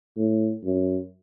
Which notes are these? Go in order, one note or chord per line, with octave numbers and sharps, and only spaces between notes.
A2
F#2